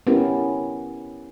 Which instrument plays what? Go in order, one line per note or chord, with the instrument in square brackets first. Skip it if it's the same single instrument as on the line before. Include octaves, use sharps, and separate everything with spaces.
[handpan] B3 C#4 E4 G4 A#4